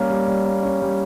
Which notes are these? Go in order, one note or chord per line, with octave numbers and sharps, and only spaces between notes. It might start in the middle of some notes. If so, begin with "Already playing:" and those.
Already playing: G3 A#3 C#4
G3
G3
A#3
C#4
G3